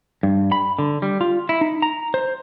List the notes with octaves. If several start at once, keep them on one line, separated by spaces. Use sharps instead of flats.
G2
B5
D3
G3
F4
E4
D#4
A#5
C5